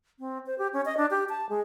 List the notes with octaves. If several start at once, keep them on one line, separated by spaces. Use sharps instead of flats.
C4
C5
G4
C#4
D#5
D4
G4
A5
G#3